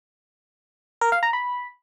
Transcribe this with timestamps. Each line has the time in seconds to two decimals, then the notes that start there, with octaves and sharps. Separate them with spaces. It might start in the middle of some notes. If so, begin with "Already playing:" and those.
1.01 A#4
1.12 F5
1.23 A#5
1.33 B5